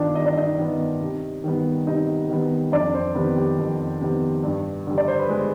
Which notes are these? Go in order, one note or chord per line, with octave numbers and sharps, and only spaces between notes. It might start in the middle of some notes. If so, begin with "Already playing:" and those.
Already playing: G2 D#3 B3 D4 F4 D5
G2 D#5
D5
D#4 D#5
D#3 B3
C3
D#3 G3 B3
C3 D#4 D#5
D#3 G3 B3
F2 D4 D5
C4 C5
C3 D#3 B3 B4
G4
F2
C3 D#3 B3
G2
D3 G3
D5
C5
B4
G#3 G#4